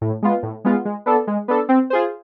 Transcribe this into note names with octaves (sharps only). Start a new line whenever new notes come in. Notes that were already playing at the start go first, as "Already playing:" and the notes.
A2
G#3 B3 F4
A2
G#3 B3 F4
G#3
B3 D4 A4
G#3
B3 D4 A4
C4
F4 G#4 C5